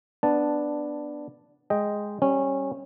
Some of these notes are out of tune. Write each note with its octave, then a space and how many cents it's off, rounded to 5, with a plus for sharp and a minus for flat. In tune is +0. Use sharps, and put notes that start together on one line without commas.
B3 +0 D4 +5 A5 +0
G#3 +0 D#5 +0 G5 +0
G3 +0 C#4 -20